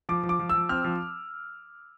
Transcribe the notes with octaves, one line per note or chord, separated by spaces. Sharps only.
F3 D6
F3
D6
F3
E6
F3
C4 F6
F3